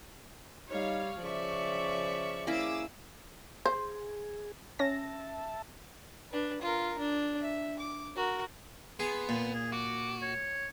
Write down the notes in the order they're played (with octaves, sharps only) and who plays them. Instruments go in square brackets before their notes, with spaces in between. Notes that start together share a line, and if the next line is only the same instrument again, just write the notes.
[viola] G3 [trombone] D#4 [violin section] C#5 F5
[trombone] C#3 [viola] F3 D5 [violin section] E5 C#6
[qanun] A#3 C#4 E4 [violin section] G#4 D6 E6
[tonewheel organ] G#4 [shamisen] C5
[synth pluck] C#4 A#6 [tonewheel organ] E5 A5
[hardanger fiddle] D4 B4
F4 A#4
D4
E5
D6
F#4 A#4
[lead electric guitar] B3 [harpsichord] G#4 [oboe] C6
[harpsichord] A#2
[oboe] G#4
[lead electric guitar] F#4 [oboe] D6
[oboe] C#5